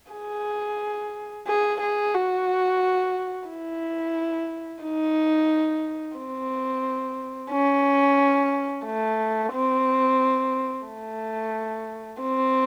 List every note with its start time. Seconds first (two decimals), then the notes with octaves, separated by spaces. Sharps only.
0.12 G#4
1.47 G#4
1.81 G#4
2.14 F#4
3.49 E4
4.83 D#4
6.17 C4
7.51 C#4
8.85 A3
9.53 C4
10.86 A3
12.21 C4